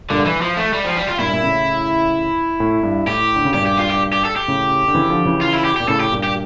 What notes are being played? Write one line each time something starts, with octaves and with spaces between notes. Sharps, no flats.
G2 A#2 D3
E3
F3
A3
G3
F3
G3
F4
G2 A#2 E4
A#2
A2 C#3
A2
G2
A2 G4
D3
C#3
G2 A#2 G4
G4
F4
G4
G4
A4
G4
A2 C#3
D3
C#3 E3
D3 F3
C#3 E3
F4
E4
G4
A#2 G4
A2 C#3 A4
G4
G2 A#2
G4